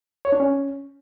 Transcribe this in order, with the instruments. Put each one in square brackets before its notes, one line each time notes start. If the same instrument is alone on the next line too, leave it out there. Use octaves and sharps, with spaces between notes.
[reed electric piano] C#5
D4
C#4